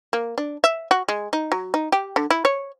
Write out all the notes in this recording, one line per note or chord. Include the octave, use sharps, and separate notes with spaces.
A#3
D4
E5
F#4
G#3
D#4
F#3
D#4
G4
D3
E4
C#5